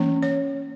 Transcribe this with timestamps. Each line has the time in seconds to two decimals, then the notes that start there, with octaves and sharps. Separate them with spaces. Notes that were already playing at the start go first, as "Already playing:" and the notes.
Already playing: E3 A#3 C#4
0.23 C#5